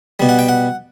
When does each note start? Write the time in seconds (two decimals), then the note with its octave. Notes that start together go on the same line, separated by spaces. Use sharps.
0.20 B2 G3
0.29 F#5
0.39 G5
0.49 F#5